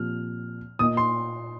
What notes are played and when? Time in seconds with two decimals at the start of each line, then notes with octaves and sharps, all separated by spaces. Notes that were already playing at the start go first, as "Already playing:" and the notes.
Already playing: A#2 F3 C4 G4 F6
0.79 A#2 A#3 F4 D#5 D#6
0.97 C6